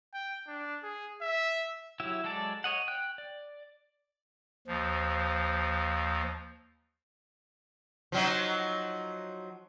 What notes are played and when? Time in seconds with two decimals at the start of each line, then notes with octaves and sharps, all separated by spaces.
0.14 G5
0.48 D4
0.83 G#4
1.21 E5
2.00 F#3 E4 G4 E5
2.24 F#3 G#3 A4 D5 A5
2.64 C#5 D#5 F#5
2.88 G5 F#6
3.18 D5
4.67 D#2 F3
8.12 F3 F#3 D#4